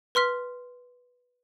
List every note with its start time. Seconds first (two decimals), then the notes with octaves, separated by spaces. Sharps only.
0.15 B4 C6 F6 B6